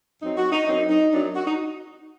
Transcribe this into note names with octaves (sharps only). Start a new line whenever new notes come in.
F#2 F#3 C4 D#4
F#4
D#4
F#2 F#3 C4 D#4
D#4
F#2 F#3 C4 D4
F#4
D#4